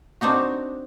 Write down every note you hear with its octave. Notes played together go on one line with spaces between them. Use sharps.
C4 D4 D#4 F#4